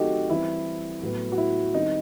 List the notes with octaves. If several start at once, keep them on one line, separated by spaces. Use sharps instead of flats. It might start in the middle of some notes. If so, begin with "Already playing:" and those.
Already playing: D#3 F#3 A3 C4 D#4 F#4 G4 A4
E3 G3 C4 E4
A2 F#3 B3
F#4
E4
D#3 G3 C4 D#4